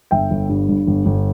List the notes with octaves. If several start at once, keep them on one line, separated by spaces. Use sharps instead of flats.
G1 E5 G5
G1
G2
G2
G1
G1